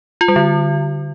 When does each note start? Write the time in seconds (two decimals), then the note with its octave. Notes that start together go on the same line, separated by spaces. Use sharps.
0.21 F4
0.28 G3
0.36 D3